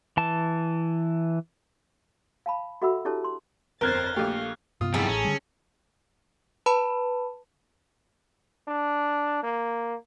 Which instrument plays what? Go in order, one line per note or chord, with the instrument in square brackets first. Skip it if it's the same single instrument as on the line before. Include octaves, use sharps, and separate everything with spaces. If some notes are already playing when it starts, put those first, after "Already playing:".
[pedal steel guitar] E3 A5
[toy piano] F5 A5 B5
F#4 A4 E5 F#5 B5 E6
D4 E4 G4 A4 C#5 A5
C6
[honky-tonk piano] G1 F2 [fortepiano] A#4 [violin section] C5 A6 [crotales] F6 F#6 G#6
[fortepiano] A#1 G4 [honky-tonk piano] A3 [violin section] F5
[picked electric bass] G2 C3 B3 [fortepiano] F4 D#6
[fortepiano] B1 E4 [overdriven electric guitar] F2 G3 [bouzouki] G#4 A4
[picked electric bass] A1 [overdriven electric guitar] C#4 [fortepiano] A#5
[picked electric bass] D3 G3
[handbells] B4 A5 B5
[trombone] D4
A#3